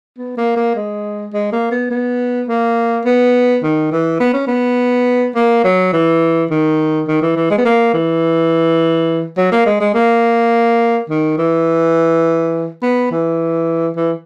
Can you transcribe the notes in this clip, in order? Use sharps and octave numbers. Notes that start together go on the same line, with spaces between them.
B3
A#3
A#3
G#3
G#3
A#3
B3
B3
A#3
B3
D#3
E3
B3
C#4
B3
A#3
F#3
E3
D#3
D#3
E3
E3
G#3
B3
A#3
E3
F#3
A#3
G#3
G#3
A#3
D#3
E3
B3
E3
E3